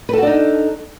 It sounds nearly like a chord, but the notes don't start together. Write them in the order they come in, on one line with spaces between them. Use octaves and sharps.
B4 A4 F#4 D4 D#4